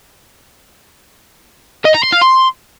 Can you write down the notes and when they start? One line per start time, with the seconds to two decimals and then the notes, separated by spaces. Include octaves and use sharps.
1.85 D#5
1.94 A#5
2.03 C6
2.12 F5
2.22 C6